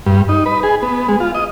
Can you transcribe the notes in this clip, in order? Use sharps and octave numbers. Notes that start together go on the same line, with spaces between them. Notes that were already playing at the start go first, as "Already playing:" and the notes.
G2
D#4
B4
G#4
B3
G#3
F4
D#5